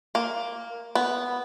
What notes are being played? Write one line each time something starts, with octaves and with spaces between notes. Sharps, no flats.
A#3
B3